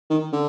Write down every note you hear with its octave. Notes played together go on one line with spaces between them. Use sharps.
D#3
D3